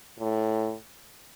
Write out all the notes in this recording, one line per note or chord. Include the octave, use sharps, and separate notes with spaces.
A2